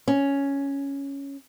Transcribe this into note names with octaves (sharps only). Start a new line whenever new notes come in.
C#4